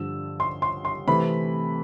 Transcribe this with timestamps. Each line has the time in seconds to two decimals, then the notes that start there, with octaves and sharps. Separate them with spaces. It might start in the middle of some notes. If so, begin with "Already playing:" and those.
Already playing: G2 D3 F3 E6
0.40 C6
0.62 C6
0.85 C6
1.07 C3 E3 A3 C4 B5